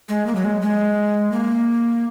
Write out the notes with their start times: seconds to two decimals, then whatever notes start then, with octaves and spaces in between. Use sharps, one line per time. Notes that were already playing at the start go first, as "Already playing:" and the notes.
0.09 G#3
0.26 A#3
0.35 F#3
0.44 G#3
0.62 G#3
1.32 A#3